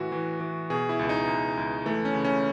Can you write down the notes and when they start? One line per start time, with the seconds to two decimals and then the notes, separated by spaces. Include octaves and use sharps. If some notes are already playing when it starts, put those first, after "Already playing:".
Already playing: A2 E3 F#4
0.12 E3
0.40 E3
0.70 B2 G#4
0.89 E4
0.99 C#2
1.09 D#4
1.27 C#2
1.57 C#2
1.85 E3 A3
2.05 C#4
2.14 C#3
2.25 C#4